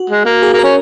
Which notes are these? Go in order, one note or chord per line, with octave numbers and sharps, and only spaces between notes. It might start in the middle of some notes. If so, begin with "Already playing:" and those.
Already playing: F#4
G#3
A#3
G#4
A#3
C#4 A#4